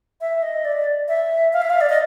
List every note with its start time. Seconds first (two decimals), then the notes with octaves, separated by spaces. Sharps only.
0.21 E5
0.43 D#5
0.65 D5
1.08 E5
1.53 F5
1.62 E5
1.70 F5
1.81 D5
1.89 D#5